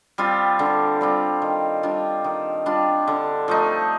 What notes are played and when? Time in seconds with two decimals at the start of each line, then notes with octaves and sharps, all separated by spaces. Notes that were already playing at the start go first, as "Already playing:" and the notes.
0.18 G3 C4 F4
0.59 D3
1.01 G3 C4 F4
1.42 D#3
1.83 G3 D4 F4
2.24 D#3
2.66 G3 D4 F4
3.08 D3
3.48 F3 A3 D#4